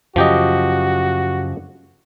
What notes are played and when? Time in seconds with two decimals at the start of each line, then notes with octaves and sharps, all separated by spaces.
0.16 F#2 C#3 F3 F#4 G4 D#5